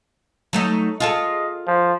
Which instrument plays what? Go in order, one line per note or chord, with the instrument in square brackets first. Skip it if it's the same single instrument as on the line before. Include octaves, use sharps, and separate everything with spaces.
[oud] F#3 A3 D#4
[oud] F4 G#4 A4 [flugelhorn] D#5
[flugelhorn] F3